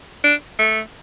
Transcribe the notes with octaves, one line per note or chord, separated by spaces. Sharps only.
D4
A3